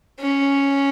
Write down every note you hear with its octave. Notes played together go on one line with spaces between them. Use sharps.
C#4